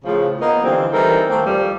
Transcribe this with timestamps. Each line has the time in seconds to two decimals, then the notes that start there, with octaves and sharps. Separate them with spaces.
0.05 A2 C#3 F3
0.40 A#3 B3 D#4
0.64 D3 E3 F3 G3 C4
0.92 E3 G3 D#4 A4 A#4 C5
1.29 D#3 A3 A#3 C4
1.46 F2 F3 G3